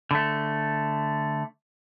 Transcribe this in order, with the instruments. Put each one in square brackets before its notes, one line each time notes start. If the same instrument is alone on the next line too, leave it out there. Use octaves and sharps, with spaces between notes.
[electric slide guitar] D3 A3